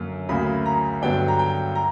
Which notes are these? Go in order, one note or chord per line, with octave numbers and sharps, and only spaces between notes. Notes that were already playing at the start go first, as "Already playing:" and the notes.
Already playing: F#2 D3 A#3
D2 C#3 F#3 A#3 C#4 B5
A#5
G2 D3 F#3 B3 D4 G5
A#5
G5
A#5